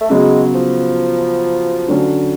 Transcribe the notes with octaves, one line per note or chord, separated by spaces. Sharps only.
A3
C#3 F#3 G#3 B3
F3
D3 F#3 C#4